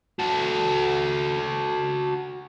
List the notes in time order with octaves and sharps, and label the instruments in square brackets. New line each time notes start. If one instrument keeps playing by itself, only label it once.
[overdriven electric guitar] F#4 A4